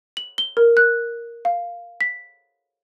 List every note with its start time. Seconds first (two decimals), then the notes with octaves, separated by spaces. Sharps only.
0.17 F#7
0.38 G7
0.57 A#4
0.77 F#6
1.45 F5
2.01 B6